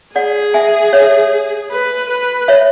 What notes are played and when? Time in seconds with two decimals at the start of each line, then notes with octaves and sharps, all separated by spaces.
0.16 G#4 D5 F#5
0.54 E5 G#5
0.93 C#5 E5
1.71 B4
2.10 B4
2.48 C#5 E5